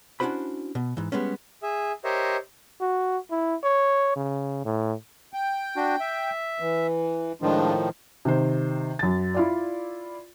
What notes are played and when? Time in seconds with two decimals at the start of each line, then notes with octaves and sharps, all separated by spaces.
0.20 C#4 D4 E4 F#4 C5 B5
0.75 B2
0.97 G#2 E3
1.12 G3 G#3 B3 C#4
1.62 G#4 E5
2.04 G4 A#4 C5 C#5 D#5 E5
2.81 F#4
3.31 E4
3.64 C#5
4.16 C#3
4.65 A2
5.34 G5
5.76 D4 F#4
6.00 E5
6.60 E3
7.42 A2 D#3 F3 G#3 D4 F4
8.25 C3 D#3 C5
8.99 F#2 A6
9.35 E4 F4 D5